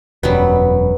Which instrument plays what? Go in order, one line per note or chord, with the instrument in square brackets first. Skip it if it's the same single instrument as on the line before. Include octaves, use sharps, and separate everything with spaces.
[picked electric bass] E1 F#2 [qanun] F#3 G3 B3